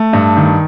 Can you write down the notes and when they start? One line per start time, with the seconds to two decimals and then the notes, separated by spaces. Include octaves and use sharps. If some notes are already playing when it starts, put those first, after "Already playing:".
Already playing: A3
0.13 G2
0.37 D#3